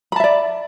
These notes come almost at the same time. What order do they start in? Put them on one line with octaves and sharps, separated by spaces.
B5 A5 E5 D5